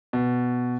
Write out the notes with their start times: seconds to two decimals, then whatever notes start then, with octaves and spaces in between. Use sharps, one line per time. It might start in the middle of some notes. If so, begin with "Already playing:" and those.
0.13 B2